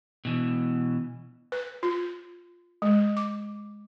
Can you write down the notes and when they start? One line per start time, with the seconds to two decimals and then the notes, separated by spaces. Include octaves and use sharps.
0.25 B2 E3
1.52 B4
1.83 F4
2.82 G#3
3.17 D6